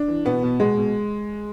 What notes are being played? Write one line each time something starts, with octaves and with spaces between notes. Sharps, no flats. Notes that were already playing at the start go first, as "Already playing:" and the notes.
Already playing: D4
E3
B2 B3
B2
B2 G#3
B2